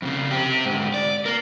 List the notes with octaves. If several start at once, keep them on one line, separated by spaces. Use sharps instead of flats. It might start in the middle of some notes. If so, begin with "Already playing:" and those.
F2 C#3
C4 G4
G#2 D3
D5
A#3 A#4